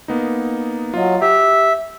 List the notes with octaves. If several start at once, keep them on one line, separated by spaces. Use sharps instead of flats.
A#3 B3 D#4
F#3 F4 D#5
G4 E5